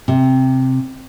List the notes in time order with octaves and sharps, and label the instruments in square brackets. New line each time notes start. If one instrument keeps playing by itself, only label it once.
[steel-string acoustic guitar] C3